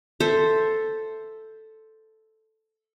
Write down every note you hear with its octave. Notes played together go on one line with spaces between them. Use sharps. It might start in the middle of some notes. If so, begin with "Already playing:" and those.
A4 C5 E5